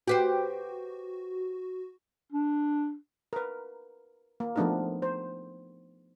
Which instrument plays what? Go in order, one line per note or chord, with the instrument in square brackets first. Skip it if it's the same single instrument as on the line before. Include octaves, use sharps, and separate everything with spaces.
[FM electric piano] F#4 [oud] G4 B4 C5
[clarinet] D4
[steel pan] A#4 B4
A#3
F3 A3 B3 D4 D#4 A#4
C5